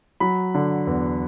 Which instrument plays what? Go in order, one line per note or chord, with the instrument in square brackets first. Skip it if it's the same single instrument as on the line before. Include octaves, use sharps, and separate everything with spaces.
[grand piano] F#3 B5
D3
E2